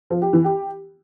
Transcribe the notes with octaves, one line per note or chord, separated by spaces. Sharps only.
F3
G4
E3
G4